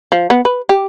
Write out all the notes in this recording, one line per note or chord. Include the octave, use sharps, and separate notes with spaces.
F3
B3
B4
G4